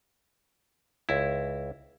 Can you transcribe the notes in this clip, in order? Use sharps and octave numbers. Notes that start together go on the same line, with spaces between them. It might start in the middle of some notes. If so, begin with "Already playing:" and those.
C#2 E4